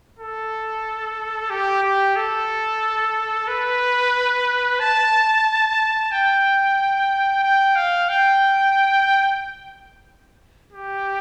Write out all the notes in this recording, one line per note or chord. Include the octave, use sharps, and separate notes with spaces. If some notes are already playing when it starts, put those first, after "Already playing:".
A4
G4
G4
A4
B4
A5
G5
G5
F5
G5
G4